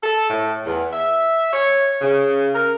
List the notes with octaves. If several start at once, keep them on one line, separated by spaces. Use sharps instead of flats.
A4
A2
E2
E5
C#5
C#3
A#4